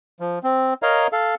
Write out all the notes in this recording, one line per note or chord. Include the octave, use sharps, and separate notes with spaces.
F3
C4
A#4 C#5 D#5 F5 A#5
A4 F5